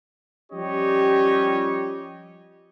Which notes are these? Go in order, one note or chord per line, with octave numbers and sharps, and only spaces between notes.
F3 G3 C#4 G4 C#5 D#5